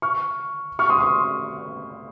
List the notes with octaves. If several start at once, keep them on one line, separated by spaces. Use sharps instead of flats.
C#6 F6
C#6 F6
C6 D#6
C#6
C6 D#6